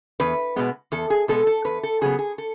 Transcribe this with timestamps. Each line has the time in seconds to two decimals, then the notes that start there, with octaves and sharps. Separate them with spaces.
0.20 E2 B4
0.56 B2 G#3 B3
0.92 E2 A4
1.10 G#4
1.28 B2 G#3 B3 A4
1.47 A4
1.64 E2 B4
1.83 A4
2.01 C#3 F#3 B3 G#4
2.19 G#4
2.38 A4